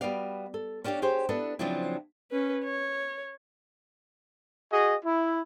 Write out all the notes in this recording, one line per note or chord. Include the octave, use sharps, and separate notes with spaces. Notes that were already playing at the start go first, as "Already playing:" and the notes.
G3 B3 F#4 D5 F5
A4
C#4 D4 G4 C#5 F5
G4 G#4 C5 C#5
B3 D4 E4 A4 B4
C#3 F3 F#3 C4 D4 E4
C#4 B4
C#5
F#4 G#4 D#5
E4